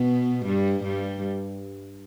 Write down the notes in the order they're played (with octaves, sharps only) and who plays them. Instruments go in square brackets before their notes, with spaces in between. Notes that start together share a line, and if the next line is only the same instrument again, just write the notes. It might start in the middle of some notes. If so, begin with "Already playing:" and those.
Already playing: [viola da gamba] B2 B3
G2 G3
G2 G3